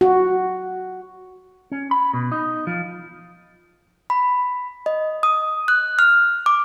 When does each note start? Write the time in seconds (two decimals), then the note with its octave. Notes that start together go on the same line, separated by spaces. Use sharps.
0.01 F#4
1.72 C#4
1.91 B5
2.14 B2
2.32 D#4
2.67 F3
4.10 B5
4.86 D#5
5.23 D#6
5.68 F#6
5.99 F6
6.46 D6